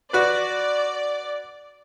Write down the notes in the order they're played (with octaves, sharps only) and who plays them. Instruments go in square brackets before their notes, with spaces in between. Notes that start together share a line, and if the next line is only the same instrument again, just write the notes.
[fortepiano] F#4 B4 [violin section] D5